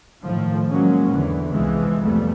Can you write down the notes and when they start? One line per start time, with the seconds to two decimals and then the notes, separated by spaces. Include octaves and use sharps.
0.24 A2 D#3 F3
0.67 F#3 G#3 A#3 C#4
1.10 E2 D3 E3
1.51 C2 E3 F3 G#3
2.02 F2 C3 G3 A3 B3